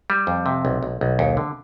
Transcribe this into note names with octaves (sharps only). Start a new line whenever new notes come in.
G3
F2
C3
B1
B1
B1
D#2
D3